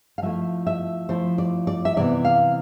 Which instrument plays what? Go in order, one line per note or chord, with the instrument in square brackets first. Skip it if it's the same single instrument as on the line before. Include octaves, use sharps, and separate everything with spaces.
[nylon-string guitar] F5
F3 A3 E4 E5
E5
F3 A3 E4 C5
D5
D5
E5
C3 E3 B3 D5
F5